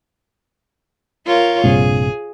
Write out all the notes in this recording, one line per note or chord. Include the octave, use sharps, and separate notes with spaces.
F4 A#4 C#5
A#1 G2 C3 G#4